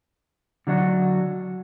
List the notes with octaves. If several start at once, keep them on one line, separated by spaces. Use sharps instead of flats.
D3 F#3 D4 F#4